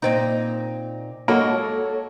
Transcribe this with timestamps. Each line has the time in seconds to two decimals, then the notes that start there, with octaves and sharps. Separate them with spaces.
0.02 A#2 C4 D#4
1.28 G#3 A#3 F#4 A4 C#5